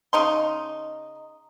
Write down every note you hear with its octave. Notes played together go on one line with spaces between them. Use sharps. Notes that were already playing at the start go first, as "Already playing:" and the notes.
C#3 D#4 C6